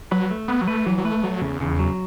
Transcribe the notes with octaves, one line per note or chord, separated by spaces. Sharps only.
F#3 B4
A3
B3 B4
F#3
A3 B4
E3 F#3
F#3
A3 B4
F#3 A3
E2 C#3
C#3
F#3